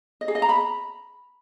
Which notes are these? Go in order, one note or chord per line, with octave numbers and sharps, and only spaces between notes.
D#5
G#4
D#5
A#5
B5